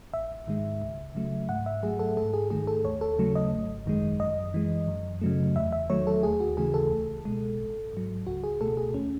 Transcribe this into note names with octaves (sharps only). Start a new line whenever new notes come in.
A1 E5
G#2 D#3 G#3
C#2
C#3 F#3 A3
G#2 F#5
E5
F#3 A3 G#4
A4
G#2 A4
G#4
D#3 A3 G#4
A4
D#2 C#5
A4
C#3 F#3 A3
D#5
G#1
F#2 D#3 G#3
F#2 D#5
E3 G#3
F#2
C#3 F#3 A3
E2 E5
E5
D#3 F#3 A3 C#5
A4
D#2 G#4
F#4
C#3 E3 A3 G#4
A4
C#2
B2 G#3
A1
G#2 F#3
C#2 F#4
G#4
B2 A3 A4
G#4
D#2 C#4